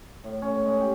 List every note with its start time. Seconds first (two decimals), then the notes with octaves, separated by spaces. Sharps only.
0.24 A2
0.42 C#4
0.66 G#3
0.80 G4